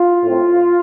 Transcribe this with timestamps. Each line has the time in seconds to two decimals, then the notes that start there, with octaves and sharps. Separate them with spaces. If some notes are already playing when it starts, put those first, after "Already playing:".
Already playing: F4
0.23 A2 A3 C4